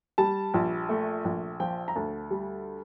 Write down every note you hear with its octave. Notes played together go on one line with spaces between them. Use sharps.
G3 A5
A#1
A3
A#1
F3 G5
A#5
D2 A5
G3